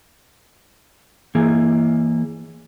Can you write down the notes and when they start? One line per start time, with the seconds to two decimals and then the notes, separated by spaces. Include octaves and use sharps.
1.35 E3 A#3 G#4 A#5